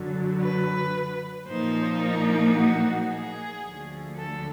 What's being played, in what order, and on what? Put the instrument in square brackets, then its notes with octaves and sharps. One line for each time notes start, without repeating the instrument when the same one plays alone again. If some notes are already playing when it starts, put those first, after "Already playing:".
Already playing: [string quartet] F#2 D3 F#3
B4
A#2 F3 A#3 D#4 C5
A#4
F#4
G#4
D2 D3 F3 A3
A4